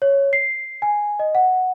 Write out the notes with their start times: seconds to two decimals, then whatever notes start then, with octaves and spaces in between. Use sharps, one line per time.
0.02 C#5
0.33 C7
0.82 G#5
1.19 D#5
1.35 F#5